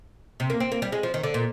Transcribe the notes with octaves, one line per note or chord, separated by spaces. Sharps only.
C3
A#3
C4
A#3
G3
G#3
F3
D#3
D3
A#2